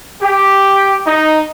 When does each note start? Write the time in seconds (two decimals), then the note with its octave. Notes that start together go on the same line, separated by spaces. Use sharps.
0.22 G4
1.06 D#4